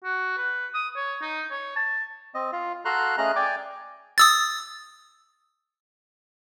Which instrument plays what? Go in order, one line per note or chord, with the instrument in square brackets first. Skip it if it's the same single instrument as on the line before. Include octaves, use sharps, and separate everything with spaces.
[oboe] F#4
B4
D#6
C#5
D#4
C#5
A5
[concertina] C4 D#5
F4 F5
F#4 A4 F5 A#5 C6 F#6
A3 C#4 G#4 D#5 A#5 F#6
D5 G5 G#5 D6
[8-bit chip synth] D#6 E6 A6